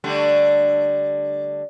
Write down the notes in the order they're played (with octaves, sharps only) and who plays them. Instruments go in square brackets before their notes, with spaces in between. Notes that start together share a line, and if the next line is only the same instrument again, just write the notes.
[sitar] D3 G3 A3